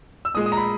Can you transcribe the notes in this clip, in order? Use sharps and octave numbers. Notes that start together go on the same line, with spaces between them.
E6
A#2 G#3 D#6
D#6
A#5
B5